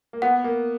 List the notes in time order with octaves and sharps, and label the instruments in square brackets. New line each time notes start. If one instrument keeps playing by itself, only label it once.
[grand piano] A#3
[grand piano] B3 [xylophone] F#5
[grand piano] A#3